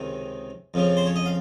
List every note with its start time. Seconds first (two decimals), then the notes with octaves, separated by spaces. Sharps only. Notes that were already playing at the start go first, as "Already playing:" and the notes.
Already playing: C#2 C3 D#3
0.74 F2 C#3 F3
0.97 C5
1.06 C#5
1.16 D#5
1.26 F5